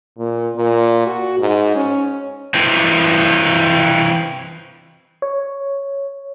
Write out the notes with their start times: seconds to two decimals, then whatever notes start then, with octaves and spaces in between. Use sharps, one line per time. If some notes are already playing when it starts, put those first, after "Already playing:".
0.18 A#2
0.56 A#2
1.06 F#4
1.39 G#2
1.76 C#4
2.54 E3 C4
5.22 C#5